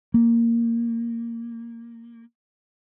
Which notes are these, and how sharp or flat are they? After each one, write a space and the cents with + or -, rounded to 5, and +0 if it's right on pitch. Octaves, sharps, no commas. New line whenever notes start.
A#3 -5